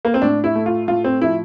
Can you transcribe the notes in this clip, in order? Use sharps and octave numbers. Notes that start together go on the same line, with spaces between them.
A#3
C4
A2 D4
E4
A3
F4
A2 F4
C4
F3 E4